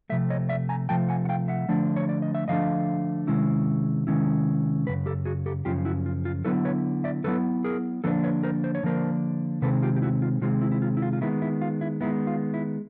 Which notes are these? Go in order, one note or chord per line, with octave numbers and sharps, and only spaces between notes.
C3 F3 A3 E5
C#5 D#5
D5 E5
G#5 A#5
C3 F3 A3 G5 A5
F#5 G#5
F#5
F5 G5
E5 F#5
D3 F3 A3 D4
C#5
D5
D#5
E5
D3 F3 A3 D4 D#5 F5
C3 D#3 G#3 C#4 E4
C3 D#3 G#3 C#4 E4
F#2 C#3 B4
G4 A4
F#4 G#4
G4 A4
F#2 C#3 F3 F4 G4
E4 F#4
F4
F4
D3 F#3 B3 E4 A4 B4
B4 C#5
D5 E5
D3 F#3 B3 E4 A4 B4
G#4 A#4
D3 F3 A#3 D4 A4 B4
B4 C#5
A#4 C5
C5
C#5
D3 F3 A#3 D4 A#4 C5
C3 D#3 G#3 C4 A4 B4
F4 G4
G4
E4 F#4
F4
C3 D#3 G#3 C4 F4
E4
E4
F4
E4
F4
F4
D#3 G#3 B3 E4
E4
F4
E4
D#3 G#3 B3 E4
F4
E4